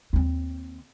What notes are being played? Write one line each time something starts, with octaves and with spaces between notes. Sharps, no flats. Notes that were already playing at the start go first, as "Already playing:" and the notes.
D#2 C4